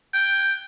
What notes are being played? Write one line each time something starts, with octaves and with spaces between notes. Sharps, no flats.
G5